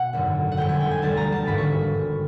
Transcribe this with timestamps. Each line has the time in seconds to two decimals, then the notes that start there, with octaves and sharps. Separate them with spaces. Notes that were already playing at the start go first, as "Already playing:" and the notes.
Already playing: B2 F#5
0.13 G#1 F#2 D3
0.52 F#5
0.57 G1 F2 D3 G5
0.69 G#5
0.80 G5
0.91 G#5
1.02 E1 D2 D3 G3 A5
1.17 A#5
1.32 A5
1.46 G#1 G2 D3 B5
1.58 C#6